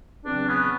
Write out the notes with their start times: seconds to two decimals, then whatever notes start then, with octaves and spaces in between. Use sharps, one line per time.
0.24 E2 C#3 F#3 C4 D4
0.48 B3 C#4